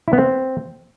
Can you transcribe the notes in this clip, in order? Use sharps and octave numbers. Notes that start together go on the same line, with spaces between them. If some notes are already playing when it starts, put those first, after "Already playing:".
E4
B3
C4